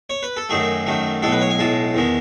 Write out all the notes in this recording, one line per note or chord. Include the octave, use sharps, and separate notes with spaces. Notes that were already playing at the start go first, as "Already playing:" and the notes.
C#5
B4
A4
F#2 D#3 A3 G#4
F#2 D#3 A3
B1 A2 G#3 A4
B4
C#5
G#5
B1 A2 G#3 A5
E2 D#3 G#3